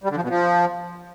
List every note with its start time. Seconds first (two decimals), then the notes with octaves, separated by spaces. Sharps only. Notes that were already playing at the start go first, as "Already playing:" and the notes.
0.04 G3
0.10 D3
0.16 F3
0.23 B2
0.29 F3